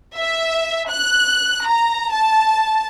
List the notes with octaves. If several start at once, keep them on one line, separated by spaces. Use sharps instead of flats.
E5
F#6
A#5
A5